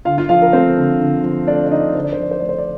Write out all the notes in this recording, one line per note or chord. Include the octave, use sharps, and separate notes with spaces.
D3 F4 F5
F4 F5
F3 F4 F5
A#4
A3 C4 C5
D3
D3
F3
A3 D4 D5
D5
D3 D#4 D#5
D3 C5
D5
C5
F3 D5
C5
A3 D5
C5
D5